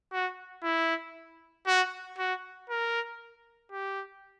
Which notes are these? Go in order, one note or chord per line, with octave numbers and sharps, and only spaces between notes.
F#4
E4
F#4
F#4
A#4
G4